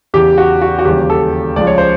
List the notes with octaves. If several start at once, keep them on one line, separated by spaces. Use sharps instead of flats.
E2 C#3 E3 G4
F#4
F#4
F#4
D#2 C#3 E3 G3 G4
A4
C#2 C#3 F3 D5
C#5
C5